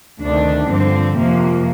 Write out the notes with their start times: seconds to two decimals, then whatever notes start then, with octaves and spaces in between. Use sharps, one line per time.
0.21 D2 C3 D#3 D4
0.69 G2 D3 F3 C4
1.17 F2 C3 F3 A#3